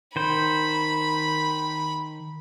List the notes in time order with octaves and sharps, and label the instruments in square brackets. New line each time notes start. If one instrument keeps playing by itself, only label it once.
[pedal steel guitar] D#3 C5 [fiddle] B5